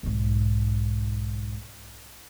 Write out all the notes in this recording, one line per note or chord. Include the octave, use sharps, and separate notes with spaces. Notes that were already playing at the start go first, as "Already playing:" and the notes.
B1 G#2